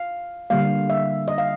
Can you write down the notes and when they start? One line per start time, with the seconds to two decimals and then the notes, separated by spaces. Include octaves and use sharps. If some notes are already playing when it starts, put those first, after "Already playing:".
Already playing: F5
0.50 D3 G3 A#3 F5
0.90 E5
1.28 D#5
1.38 F5